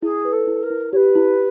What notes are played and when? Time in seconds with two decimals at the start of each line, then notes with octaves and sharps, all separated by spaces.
0.02 E4 G#4
0.25 B4
0.32 A4
0.47 E4
0.63 A#4
0.70 E4
0.92 G4 B4 C#5
1.15 E4